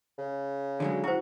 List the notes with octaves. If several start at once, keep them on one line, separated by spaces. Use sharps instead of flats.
C#3
D3 F#3 G#3
E4 F#4 C5